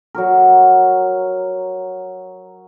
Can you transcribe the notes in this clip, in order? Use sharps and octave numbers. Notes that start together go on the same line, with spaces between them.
F#3 F#4 A#4